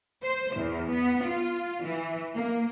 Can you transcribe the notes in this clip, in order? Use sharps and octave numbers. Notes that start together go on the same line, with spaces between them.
C5
E2
B3
F4
E3
A#3